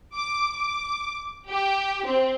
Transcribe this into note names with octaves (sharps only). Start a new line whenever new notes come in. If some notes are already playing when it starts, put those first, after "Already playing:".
D6
D6
G4
C4